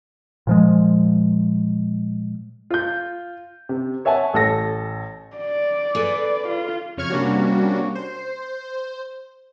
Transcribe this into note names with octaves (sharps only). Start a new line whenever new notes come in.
A#2 F3 G#3
F4 G6
C3
C#5 E5 F#5 G#5 A5
A1 A4 A#6
D5
G#4 A4 B4
F4
F2 C#3 C#5 C#6 F6 G#6
C3 G3 A#3 C#4 D4 F#4
C5